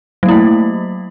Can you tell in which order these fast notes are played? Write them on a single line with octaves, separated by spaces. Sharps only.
F#3 A#3 E4 A3